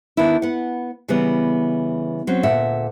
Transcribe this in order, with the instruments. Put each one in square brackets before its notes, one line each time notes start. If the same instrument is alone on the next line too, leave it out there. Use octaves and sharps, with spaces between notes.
[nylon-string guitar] D#3 B3 D4 E4
B3 F#5
C#3 E3 G3 B3
F#3 C4 C#4
D2 A#2 E5 F#5